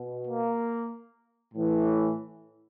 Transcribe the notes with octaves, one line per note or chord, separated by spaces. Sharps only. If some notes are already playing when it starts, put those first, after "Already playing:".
Already playing: B2
A#3
A2 E3